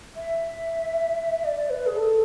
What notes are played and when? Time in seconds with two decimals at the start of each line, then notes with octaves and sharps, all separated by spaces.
0.16 E5
1.44 D5
1.70 B4
1.87 G#4
1.96 A4